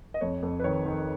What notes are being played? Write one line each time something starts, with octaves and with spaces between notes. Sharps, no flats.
D#5
F2 C#5
F2
B4
D#3 C#5
D#3